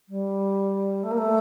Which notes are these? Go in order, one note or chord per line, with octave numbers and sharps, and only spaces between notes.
G3
A3
A#3
A3